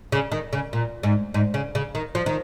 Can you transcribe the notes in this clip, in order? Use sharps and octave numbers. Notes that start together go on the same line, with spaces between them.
C#3
D#3
C#3
A#2
G#2
G#2
C#3
C#3
D#3
F3
D#3